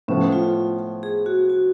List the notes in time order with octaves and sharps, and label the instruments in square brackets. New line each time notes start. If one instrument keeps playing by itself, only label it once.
[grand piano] A2 F3 B3 [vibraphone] C#4
[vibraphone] F4
G#4
F#4
F#4